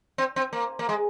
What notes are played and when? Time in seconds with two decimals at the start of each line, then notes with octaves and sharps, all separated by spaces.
0.18 C4
0.36 C4
0.53 A#3
0.79 A#3
0.89 G#3